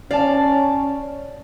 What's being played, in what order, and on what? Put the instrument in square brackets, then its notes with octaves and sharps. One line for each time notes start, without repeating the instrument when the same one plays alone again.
[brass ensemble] C#4 [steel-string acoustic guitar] D5 [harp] F5 A5